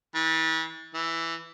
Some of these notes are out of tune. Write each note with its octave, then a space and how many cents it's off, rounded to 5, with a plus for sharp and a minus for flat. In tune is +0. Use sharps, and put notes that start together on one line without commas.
E3 -35
E3 +5